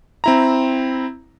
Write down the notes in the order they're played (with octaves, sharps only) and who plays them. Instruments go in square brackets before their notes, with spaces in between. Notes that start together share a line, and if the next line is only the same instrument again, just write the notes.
[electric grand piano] C4 E4 A#5